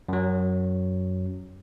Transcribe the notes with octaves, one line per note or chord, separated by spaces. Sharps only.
F#2 F#3